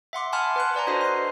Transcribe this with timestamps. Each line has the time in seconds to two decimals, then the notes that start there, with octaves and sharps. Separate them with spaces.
0.13 E5 F#5 C6 D6
0.33 F#5 G#5 A5 B5 C6 F6
0.56 B4 C6 F#6
0.75 B4 D5 G#5 A#5
0.87 D4 F#4 A4 C5 D#5 C6
1.01 C6 C7